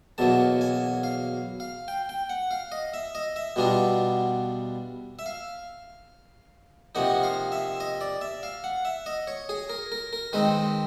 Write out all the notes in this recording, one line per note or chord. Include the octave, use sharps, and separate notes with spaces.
E2 B2 F#3 A#3 A5
G#5
F5
F5
G5
G5
F#5
F5
D#5
E5
D#5
E5
B2 G3 B3 D4 F4
E5
F5
C3 F3 A#3 D#4 F#5
F5
E5
D#5
D5
E5
F5
F#5
E5
D#5
C#5
G#4
A#4
A#4
A#4
D#3 G#3 C4 D#4 B4